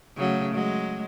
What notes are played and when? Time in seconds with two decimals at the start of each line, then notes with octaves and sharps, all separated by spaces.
0.17 C#3 F#3 A3
0.55 F#3 G#3